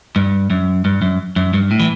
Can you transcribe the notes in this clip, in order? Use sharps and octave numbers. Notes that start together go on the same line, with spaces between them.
G2
F#2
G2
F#2
F#2
G2
A2
E3